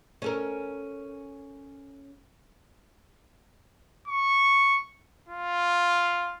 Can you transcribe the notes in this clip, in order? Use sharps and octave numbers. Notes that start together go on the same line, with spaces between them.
C#4 A4 A#4
C#6
F4